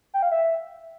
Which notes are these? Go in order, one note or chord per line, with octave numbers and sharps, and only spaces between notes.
G5
F5
E5